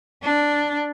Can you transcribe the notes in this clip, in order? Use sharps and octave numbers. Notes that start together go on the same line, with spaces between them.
D4